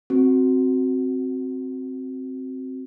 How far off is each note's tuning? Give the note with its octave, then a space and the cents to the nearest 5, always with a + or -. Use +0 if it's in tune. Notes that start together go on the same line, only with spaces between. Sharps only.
C4 +0 F#4 +0